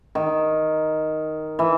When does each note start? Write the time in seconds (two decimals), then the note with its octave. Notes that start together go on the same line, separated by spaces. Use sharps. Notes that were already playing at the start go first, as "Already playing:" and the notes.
0.15 D#3
1.59 E3